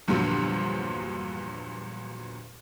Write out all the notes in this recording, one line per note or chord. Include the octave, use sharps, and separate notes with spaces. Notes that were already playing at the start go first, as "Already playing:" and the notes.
E2 G2 A#2 D3 F3 F#3